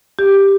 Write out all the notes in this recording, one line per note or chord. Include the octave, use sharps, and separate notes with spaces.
G4